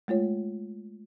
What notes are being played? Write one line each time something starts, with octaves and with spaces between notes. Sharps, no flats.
G#3 A3 F4 C#5